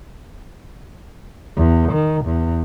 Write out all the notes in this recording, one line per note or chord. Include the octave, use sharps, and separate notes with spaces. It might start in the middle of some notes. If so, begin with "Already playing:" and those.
E2
D#3
E2